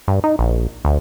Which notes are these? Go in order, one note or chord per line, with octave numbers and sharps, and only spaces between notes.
G2
D#4
A#1
D2